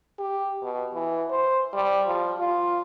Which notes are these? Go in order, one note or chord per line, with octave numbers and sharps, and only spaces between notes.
G4
B2
E3
C5
G3
F3
F4